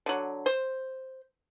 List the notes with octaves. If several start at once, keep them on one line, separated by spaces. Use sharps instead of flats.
D3 F#3
C5